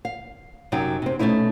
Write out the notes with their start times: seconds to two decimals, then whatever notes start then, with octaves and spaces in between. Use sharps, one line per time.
0.05 F5
0.72 F#2 C3 F#3 D#4 G5
1.02 C3 C4
1.19 B2 A3 C#4 D#4 E4